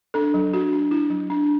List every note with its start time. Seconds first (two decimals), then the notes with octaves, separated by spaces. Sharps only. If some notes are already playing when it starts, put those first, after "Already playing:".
0.14 D4 A4
0.34 F#3
0.53 D4 F#4
0.73 D4
0.91 D4 E4
1.10 F#3
1.30 D4